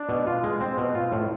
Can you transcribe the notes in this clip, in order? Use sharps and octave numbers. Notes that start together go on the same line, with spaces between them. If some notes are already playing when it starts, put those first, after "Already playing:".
Already playing: D4
B2
F4
G#3
C4
B2
F4
A2